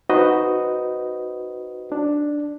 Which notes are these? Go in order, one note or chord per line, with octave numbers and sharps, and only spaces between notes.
D#4 F#4 B4 C5 D#5
D4